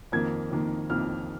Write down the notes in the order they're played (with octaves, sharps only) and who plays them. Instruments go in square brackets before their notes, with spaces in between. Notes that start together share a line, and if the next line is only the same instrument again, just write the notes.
[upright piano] F2 D#3 A#3 G#6
F2 D#3 A#3
F2 D#3 A#3 F6